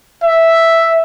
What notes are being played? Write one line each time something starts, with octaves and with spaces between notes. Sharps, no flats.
E5